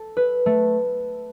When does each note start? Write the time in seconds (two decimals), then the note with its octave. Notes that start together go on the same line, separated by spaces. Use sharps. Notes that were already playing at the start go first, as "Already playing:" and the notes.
Already playing: A4
0.17 B4
0.46 A3